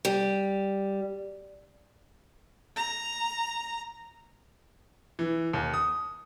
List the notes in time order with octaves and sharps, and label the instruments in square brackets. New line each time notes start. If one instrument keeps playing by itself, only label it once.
[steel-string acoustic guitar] G3
[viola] A#5
[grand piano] E3
D#2
D#6